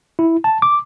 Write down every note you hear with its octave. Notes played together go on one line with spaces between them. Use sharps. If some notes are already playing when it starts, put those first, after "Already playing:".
E4
A5
D6